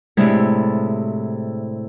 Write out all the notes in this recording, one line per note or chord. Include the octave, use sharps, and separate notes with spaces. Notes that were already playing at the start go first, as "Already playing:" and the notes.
A2 C3 G#3 A3 D4 E4